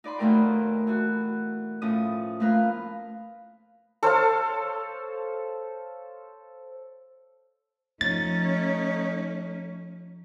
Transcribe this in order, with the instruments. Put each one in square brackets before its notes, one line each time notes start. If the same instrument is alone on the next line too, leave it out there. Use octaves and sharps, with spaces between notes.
[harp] D#4 D5 B5 C6
D#2 B2 A3 A#4 G5 C6
E3 F#4
A2 F3 C#4 D#6
A3 A#3 F4 A#4 B4 F5
[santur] A4 C5 C#5 F5
[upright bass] F3 [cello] A3 C#4 [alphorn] D#4 [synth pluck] A6